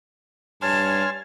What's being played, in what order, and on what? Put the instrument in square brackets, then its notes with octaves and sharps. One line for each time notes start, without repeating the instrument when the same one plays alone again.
[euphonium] G2 [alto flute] C#5 [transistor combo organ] G#5 C6 F6 [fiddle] A5